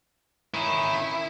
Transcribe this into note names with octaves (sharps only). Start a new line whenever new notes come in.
D#3 C#4 E4